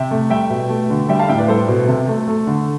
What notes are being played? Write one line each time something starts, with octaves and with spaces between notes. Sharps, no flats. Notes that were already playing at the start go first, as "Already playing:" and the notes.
Already playing: C3 E5 G5
A3
G3 E5 G5
B2
A3
D3
G3 E5 G5
F5 A5
A2 E5 G5
B4 D5
G3 A4 C5
B2
C3 A4
A3
A3
D3